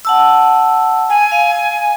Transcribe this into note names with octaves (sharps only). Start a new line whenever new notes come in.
F#5 A5 E6
G#5
F5